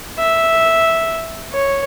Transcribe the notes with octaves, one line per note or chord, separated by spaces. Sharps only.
E5
C#5